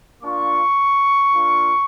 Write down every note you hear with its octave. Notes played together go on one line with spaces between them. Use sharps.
A#3 D4 F4 C#6
A#3 D4 F4